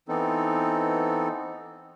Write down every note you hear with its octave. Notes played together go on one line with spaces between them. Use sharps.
E3 B3 C4 D#4 A4